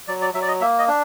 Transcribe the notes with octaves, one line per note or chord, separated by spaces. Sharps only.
F#3 D5
D5
F#3 E5
D5
D#5
A#3 E5
D#5
D4